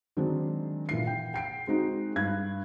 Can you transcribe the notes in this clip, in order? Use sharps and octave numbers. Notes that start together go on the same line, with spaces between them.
D#3 F#3 G#3 C4 D4 D#4
A#2 E3 C7
G5
G5 C7 D7
G#3 C4 D#4 F#4
G2 F#6 G#6